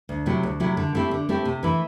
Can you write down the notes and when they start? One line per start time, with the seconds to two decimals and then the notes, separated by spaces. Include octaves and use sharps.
0.09 D2
0.26 C3 F#3 A3 E4
0.43 D2
0.60 C3 F#3 A3 E4
0.77 D3
0.95 A3 C4 E4 G4
1.11 D3
1.29 A3 C4 E4 G4
1.45 C3
1.63 E3 A3 E4